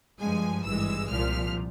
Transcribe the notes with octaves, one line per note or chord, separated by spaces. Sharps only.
G2 F3 G#3 G#5
G#1 G2 E3 G#3 E6
C2 A#2 F3 F6